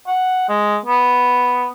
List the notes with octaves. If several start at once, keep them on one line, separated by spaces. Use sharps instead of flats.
F#5
G#3
B3